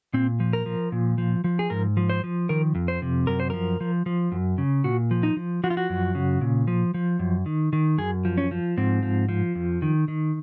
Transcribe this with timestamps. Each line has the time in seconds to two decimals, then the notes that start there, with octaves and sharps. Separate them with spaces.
0.14 A#2 C4
0.40 F3
0.53 A#4
0.66 F3
0.92 A#2
1.18 F3
1.44 F3
1.59 G#4
1.70 G#2 A#4
1.97 F3
2.10 C5
2.24 F3
2.49 D#3 A#4
2.75 F2
2.88 C5
3.02 C3
3.27 F#2 A#4
3.40 C5
3.50 F3 A#4
3.81 F3
4.06 F3
4.32 F#2
4.58 C#3
4.84 A#2 F#4
5.11 F3
5.23 D#4
5.37 F3
5.64 F3 F#4
5.70 F4
5.77 F#4
5.90 F#2
6.15 C#3
6.41 A#2
6.68 F3
6.94 F3
7.19 F#2
7.46 D#3
7.73 D#3
7.98 F#2 G#4
8.25 F3
8.38 C#4
8.51 F3
8.77 G#2 C4
9.03 F3
9.29 F3
9.55 F2
9.82 D#3
10.08 D#3